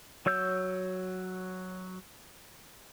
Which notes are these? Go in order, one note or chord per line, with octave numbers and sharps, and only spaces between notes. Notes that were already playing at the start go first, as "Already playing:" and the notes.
F#3 C#5 E6 G6